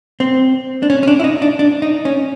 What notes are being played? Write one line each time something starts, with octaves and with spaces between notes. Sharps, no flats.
C4
D4
C#4
C#4
D4
E4
D#4
D4
D4
D#4
C#4